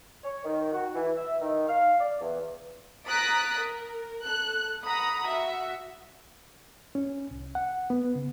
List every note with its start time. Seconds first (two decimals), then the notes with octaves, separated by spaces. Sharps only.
0.24 C#5
0.45 D#3
0.72 F#4
0.95 E3
1.16 E5
1.41 D#3
1.68 F5
2.01 D5
2.21 E2
3.07 A#5 D#6 F#6 A6 B6 D7
3.60 A#4
4.26 A4 F#6
4.85 F#5 A#5 B5 D#6
5.28 F#4 E5
6.95 C#4
7.31 C2
7.55 F#5
7.90 B3
8.15 C#3